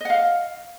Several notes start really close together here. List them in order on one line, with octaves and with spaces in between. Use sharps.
D#5 F#5 F5